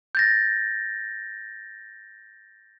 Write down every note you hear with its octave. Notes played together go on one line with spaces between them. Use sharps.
G6 A6 A#6